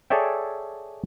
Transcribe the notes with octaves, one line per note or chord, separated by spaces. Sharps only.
G#4 A4 C#5 D5 E5 G5